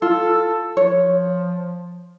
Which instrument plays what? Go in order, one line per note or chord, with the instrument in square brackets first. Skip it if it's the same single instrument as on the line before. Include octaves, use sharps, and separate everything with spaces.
[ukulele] F4 [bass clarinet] A4
[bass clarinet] F3 [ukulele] C#5